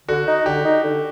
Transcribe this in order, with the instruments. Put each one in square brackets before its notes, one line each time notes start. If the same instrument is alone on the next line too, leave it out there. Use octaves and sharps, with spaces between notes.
[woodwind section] D3 [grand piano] F#4
[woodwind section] D#4
[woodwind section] D3 [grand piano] G4
[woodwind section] D#4
D3